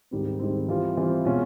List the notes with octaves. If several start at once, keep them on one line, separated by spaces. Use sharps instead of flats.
G#2 D#3 G3 C4
G#2 D#3 G3 C4
E3 G3 C4 F4
E3 G3 C4 F4
B2 G#3 C#4 F4